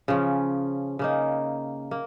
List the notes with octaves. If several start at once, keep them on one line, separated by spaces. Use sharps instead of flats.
C#3 F3 C#4
C#3 A#3 D#4
A#3